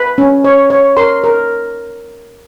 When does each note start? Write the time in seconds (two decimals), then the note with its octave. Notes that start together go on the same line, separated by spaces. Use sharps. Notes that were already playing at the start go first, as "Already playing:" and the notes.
Already playing: B4
0.18 C#4
0.44 C#5
0.70 C#5
0.97 A#4 C6
1.24 A#4